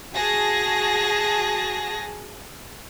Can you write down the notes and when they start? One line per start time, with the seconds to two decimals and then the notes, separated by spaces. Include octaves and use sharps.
0.15 F#4 G#4 A5 A#6